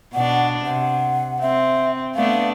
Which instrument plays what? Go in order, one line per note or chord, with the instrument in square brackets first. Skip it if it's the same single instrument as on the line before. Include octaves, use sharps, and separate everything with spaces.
[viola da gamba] B2 D4 [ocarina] F#5
[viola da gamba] C3 [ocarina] F#5
[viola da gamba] C4 [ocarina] E5
[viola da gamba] A3 B3 D4 [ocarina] F5